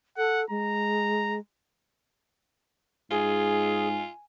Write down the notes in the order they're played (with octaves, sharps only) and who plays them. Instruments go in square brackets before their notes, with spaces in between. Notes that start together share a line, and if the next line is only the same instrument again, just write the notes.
[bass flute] A4 [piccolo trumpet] F#5
[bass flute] G#3 [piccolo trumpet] A#5
[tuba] G#2 [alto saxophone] F4 [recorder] G#4 [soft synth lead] G#5